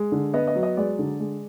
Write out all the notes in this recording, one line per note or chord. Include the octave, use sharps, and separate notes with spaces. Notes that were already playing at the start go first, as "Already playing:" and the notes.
Already playing: G#3
D3
B3 D#5
D#5
F#3
D#5
G#3 D5
D3
G#3